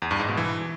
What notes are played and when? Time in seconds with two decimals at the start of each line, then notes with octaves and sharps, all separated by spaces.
0.02 E2
0.11 G2
0.20 G#2
0.28 B2
0.37 E3